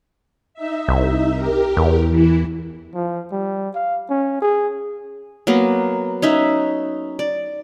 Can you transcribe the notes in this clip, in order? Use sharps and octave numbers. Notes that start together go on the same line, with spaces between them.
D#4 E5
C2
G4 A#4
E2
E3 E4
F3
G3
F5
C#4
G#4
F#3 A#3 B3
C#4 D#4 E5 F#5
D5